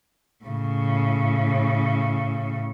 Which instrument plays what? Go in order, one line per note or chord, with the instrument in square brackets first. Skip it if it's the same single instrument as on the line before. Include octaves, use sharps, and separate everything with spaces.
[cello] A2 C#3